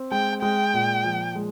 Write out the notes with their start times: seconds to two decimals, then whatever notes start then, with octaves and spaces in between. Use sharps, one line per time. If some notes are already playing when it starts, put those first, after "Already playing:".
Already playing: C4
0.11 G#3 G5
0.42 G#3 G5
0.74 A#2
1.04 F3
1.36 G#3